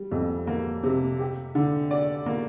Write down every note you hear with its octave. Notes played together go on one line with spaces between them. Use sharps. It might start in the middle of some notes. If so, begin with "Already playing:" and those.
Already playing: G3
F2
A#3
C3
G4
D3
D5
A#3